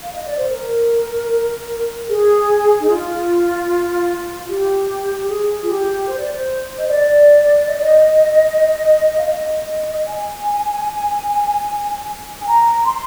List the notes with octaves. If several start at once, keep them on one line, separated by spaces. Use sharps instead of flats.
F5
D#5
D5
C5
A#4
G#4
D#4
F4
G4
G#4
F4
G4
C5
D5
C5
D#5
D5
D#5
D5
D#5
F5
D#5
G#5
G#5
A#5
C6